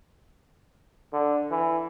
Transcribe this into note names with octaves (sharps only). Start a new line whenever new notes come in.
D3
E3